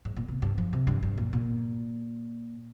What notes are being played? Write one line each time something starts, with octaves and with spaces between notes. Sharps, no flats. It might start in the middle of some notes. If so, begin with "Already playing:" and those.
G#2
A#2
C3
G2
F3
C3
G2
G2
A#2
A#2